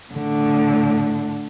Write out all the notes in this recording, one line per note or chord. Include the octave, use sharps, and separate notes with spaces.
A2 D3